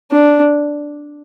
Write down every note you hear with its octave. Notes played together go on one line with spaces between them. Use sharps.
D4